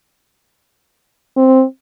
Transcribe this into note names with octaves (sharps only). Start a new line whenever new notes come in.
C4